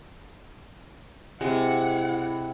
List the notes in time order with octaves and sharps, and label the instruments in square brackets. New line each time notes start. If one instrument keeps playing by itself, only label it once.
[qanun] C3 G#3 [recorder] E4 [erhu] F#5